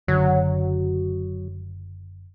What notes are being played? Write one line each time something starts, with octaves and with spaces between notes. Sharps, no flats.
F#1 F#2 D3 F#3